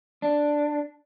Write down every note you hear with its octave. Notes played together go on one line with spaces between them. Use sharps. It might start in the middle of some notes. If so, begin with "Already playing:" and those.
D4